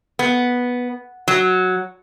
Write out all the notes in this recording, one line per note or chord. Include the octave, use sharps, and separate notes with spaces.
B3
F#3